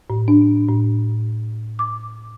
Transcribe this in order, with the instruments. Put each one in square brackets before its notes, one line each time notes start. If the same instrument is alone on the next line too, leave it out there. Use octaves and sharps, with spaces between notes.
[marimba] A2
D4
A2
D6